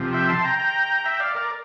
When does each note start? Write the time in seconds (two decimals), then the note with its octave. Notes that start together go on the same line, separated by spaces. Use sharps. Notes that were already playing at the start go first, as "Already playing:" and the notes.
Already playing: C3 F3
0.13 E5 G5
0.29 A5 C6
0.44 G5 A#5
0.59 G5 A#5
1.04 E5 G5
1.20 D5 F5
1.35 A#4 D5